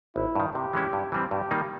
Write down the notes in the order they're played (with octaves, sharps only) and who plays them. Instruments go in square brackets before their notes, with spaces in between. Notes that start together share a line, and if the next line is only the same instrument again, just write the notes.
[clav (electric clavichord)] G#1 [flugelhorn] E4
[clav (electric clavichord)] G2 D#3
[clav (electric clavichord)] C3 [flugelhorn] G4
[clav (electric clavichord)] E3 G#3 C#4 E4
G2
E3 G3 C4
[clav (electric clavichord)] G2 [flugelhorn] G4
[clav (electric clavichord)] D#3 G3 A#3 D#4